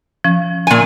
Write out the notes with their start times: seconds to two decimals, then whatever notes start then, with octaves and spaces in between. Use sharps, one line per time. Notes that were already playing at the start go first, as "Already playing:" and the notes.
0.24 F3 C#4
0.67 A#2 G#5